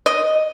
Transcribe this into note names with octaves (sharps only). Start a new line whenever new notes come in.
D#5